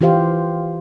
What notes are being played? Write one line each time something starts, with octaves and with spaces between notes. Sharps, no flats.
E3 F4 G4 C5 F5